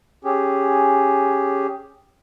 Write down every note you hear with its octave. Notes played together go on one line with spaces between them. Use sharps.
C#4 G4 G#4